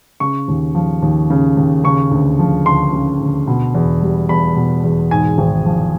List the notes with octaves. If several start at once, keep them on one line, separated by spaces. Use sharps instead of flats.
C#3 C#6
D#2
F3
D#2
C#3
D#2
C#3 C#6
D2
F3
D2 C6
C#3
D2
B2
E2
G3
E2 B5
B2
E2
G#2 G#5
G#1
F3